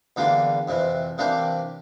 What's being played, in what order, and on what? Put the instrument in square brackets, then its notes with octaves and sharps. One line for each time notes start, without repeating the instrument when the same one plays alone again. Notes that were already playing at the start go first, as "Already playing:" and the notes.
[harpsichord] E2 D3 G3 A#3 F4
F2 C3 E3
C3 E3 A#3 D4 G4